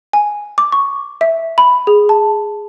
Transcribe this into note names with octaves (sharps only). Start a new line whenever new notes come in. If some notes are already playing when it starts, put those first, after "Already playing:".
G#5
D6
C#6
E5
B5
G#4
A5